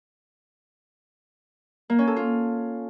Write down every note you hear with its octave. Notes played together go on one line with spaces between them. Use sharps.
A#3
C#4
A4
F4